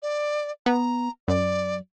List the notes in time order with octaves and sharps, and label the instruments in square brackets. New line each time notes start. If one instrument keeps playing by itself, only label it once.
[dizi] D5
[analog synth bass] B3 [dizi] A#5
[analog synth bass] F#2 [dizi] D5